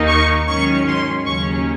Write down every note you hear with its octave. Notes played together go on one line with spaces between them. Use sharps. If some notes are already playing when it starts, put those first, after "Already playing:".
Already playing: D#2 D#3 A#3 D#4
C#6
G#2 D#3 F#3 C#4 C#6
C6
D#2 C#3 F#3 C#4 C#6